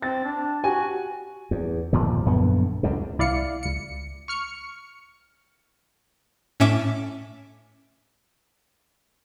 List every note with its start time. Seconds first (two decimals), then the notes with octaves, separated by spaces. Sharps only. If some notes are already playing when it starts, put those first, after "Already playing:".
0.02 C4 A6
0.25 D4
0.64 F#4 G4 G#5
1.51 E2
1.93 G1 D#2 A#2 F3
2.25 A#1 F#2 D3 B3
2.83 C#2 F#2 D3
3.19 C2 E4 D5 F5 C#7
3.63 C#2 C#7
4.28 C#6 F6 C#7
6.60 A2 C#4 E5 D6